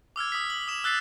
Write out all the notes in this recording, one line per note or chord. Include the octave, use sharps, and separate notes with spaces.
D6 E6 F6 G#6
D#6 B6
F#7
D#6 E7
E6 F#6 A6 B6 C7